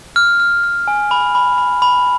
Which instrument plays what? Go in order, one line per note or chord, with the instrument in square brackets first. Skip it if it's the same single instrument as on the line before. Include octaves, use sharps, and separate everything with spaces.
[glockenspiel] F6
F6
F6
G#5
B5
B5
B5
B5